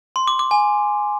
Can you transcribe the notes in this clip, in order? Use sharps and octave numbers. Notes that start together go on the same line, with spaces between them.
C6
D6
D6
G#5